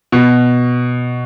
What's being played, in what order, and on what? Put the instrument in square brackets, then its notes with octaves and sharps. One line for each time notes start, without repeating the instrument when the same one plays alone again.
[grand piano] B2